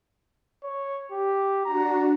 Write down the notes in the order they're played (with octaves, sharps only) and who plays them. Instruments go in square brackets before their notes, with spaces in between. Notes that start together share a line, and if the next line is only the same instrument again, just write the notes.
[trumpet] C#5
G4
[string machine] D4 F#4 [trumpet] A#5